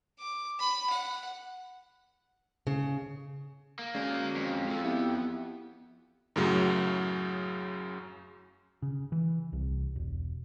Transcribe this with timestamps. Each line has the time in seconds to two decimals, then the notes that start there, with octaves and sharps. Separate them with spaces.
0.19 D6
0.59 B5
0.90 F#5
2.67 C#3
3.79 A#3
3.95 G#3 C#4 F#4 D5
4.36 F2
4.68 F4 A4
4.84 B3 E4 G4
6.36 F#2 A2 C#3 F#3
8.82 C#3
9.12 E3
9.53 C2
9.96 E1